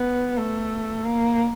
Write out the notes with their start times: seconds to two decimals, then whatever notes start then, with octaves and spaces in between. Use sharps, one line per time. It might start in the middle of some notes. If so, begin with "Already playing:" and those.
Already playing: B3
0.37 A3
1.04 A#3